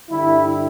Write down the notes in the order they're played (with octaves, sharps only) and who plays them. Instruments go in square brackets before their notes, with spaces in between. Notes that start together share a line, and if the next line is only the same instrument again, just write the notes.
[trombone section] G2 D3 G3 E4